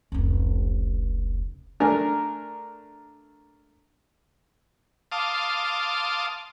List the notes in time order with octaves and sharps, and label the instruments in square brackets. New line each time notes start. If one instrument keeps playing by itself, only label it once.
[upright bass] F1 C#2
[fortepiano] A3 D4 A#4 G#5
[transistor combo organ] F5 A5 C6 D6 D#6